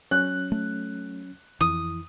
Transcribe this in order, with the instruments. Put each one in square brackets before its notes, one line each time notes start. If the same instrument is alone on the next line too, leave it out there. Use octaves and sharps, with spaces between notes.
[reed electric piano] F#3 C#4 [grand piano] F#6
[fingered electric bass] A3
[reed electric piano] F2 [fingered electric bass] E3 [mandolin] D#6